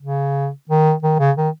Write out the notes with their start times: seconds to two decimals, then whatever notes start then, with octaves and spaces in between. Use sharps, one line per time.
0.01 C#3
0.69 D#3
1.03 D#3
1.19 C#3
1.37 D#3